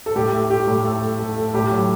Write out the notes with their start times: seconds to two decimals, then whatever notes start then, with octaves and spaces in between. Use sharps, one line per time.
0.06 A4
0.15 A2 G4
0.33 A3
0.50 A3 G4
0.67 A2
0.85 A3 A4
1.02 A3
1.19 A3 A4
1.37 A3
1.54 A2 G4
1.71 F#3